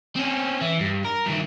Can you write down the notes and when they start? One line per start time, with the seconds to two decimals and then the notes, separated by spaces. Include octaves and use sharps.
0.16 C4 C#4
0.61 E3
0.80 G2
1.05 A#4
1.26 G2 D#3